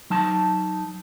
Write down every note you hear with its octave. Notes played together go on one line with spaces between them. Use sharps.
F#3 D#4 A5